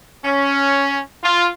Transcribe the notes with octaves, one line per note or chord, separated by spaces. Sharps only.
C#4
F4